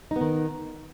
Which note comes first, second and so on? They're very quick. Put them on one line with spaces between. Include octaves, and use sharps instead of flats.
D#4 B3 D#3